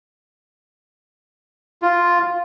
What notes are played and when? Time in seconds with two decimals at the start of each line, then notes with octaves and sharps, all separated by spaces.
1.82 F4